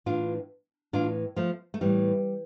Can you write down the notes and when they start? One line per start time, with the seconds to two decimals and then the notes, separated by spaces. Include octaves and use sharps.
0.06 A2 E3 D4 F4
0.93 A2 E3 D4 F4
1.36 F3 A3
1.74 A3
1.81 A2 E3 G3